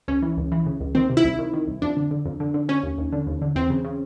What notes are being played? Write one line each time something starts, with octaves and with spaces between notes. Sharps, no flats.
C#2 C#4
E3
C#2
E3
C#3
C#2
D#3 C4
C3
E4
C2
D#3
D#3
C2
F2 D4
D3
D3
F2
D3
D3
D3 C#4
D#2
D#2
D3
D#2
D3
E2 C4
C#3
C#3